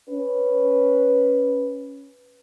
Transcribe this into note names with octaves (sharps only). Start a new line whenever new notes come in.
C#4 B4